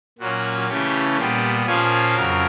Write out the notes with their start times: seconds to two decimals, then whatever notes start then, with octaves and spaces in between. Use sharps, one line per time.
0.19 A#2 F#3 A#3 C#4 F#4
0.69 C#3 E3 A3 C#4 G4
1.17 A#2 G3 B3 G4
1.66 A#2 F3 A#3 C#4 G#4
2.15 F2 C#3 F#3 A#4